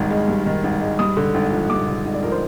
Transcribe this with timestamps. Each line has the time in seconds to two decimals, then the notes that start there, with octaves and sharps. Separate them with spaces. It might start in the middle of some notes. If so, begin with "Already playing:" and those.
Already playing: G#1 G2 D#3
0.10 G#3
0.28 G2
0.46 D#3
0.64 G#1
0.81 G#3
0.99 G2 D#6
1.17 D3
1.34 G#1
1.52 F3
1.70 G2 D6
1.88 D3
2.05 G#1 D#5
2.14 D5
2.23 F3 A#4
2.32 C5